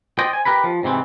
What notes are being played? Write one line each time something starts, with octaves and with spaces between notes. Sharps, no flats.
C5 D5 D#5 G5
G#5
G4 A#4 B4 B5
F3
G#2 C3 E3 C4